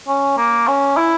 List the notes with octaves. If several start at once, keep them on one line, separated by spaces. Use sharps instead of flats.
C#4
A#3
C#4
E4